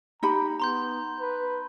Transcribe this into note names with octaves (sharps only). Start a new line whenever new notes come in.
D#4 G4 A#5 B5
B3 A#5 C6 G6
B4